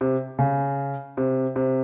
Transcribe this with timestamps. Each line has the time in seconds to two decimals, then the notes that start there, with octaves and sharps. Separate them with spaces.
0.01 C3
0.39 C#3
1.17 C3
1.56 C3